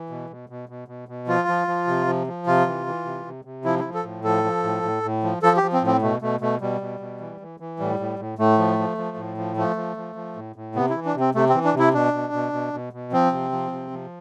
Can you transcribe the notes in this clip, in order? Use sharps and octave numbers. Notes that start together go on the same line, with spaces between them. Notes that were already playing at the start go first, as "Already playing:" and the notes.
Already playing: E3
B2
B2
B2
B2
B2
B2
F3 F4
F3
F3
C3
F3
F3
C3 F4
E3
E3
C3
C3
C3
F3 E4
F3 E4
A4
A2
F3 A4
F3
A2
A2
A2
F3
F3 A4
G4
F3
C4
A2
C4
B2 A3
B2 A3
B2 A3
B2 G3
B2
B2
E3
E3
E3
A2 G3
A2
A2
A2 A3
F3
F3
F3
A2
F3
F3 A3
F3
F3
F3
A2
A2
C3 B3
E4
E3
D4
C3
C4
C3 A3
C4
E3
D4
C3
E4
B2 D4
B2
B2
B2
B2
B2
F3 C4
C3
F3
C3
F3